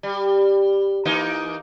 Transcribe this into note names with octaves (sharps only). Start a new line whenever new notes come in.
G3
E3 A#3 D#4